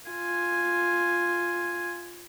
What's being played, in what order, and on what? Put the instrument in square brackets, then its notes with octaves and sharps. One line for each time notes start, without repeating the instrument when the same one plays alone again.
[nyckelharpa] F4 G#5